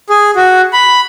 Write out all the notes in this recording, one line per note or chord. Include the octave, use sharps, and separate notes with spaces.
G#4
F#4
B5